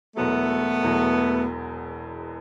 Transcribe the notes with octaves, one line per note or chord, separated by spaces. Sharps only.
E1 E2 B2 F#3 A3 B3
E1 E2 B2 F#3